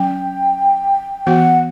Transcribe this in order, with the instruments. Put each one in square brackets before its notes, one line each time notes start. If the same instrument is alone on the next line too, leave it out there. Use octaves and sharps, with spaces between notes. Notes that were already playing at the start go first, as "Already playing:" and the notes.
Already playing: [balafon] F#3 C#4 [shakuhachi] G5
[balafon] E3 B3 F#4 [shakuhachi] F#5